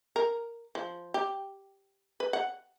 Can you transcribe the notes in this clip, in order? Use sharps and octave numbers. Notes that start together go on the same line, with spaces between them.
A#4
F3
G4
B4
F#5